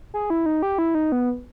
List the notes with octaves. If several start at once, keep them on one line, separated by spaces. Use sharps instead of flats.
G#4
E4
D#4
G4
E4
D#4
B3